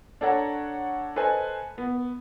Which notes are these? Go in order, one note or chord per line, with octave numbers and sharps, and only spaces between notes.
D4 A4 C#5 F#5 A#5
A4 B4 C5 D#5 G#5 A5
B3